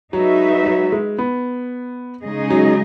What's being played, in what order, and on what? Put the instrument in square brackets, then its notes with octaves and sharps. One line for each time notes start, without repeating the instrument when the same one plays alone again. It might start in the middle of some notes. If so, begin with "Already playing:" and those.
[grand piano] F#3 [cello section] G#3 D#4 F#4 B4 E5
[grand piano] F#3
G#3
B3
[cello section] C#3 G#3 D#4 G#4 D#5
[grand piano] F#3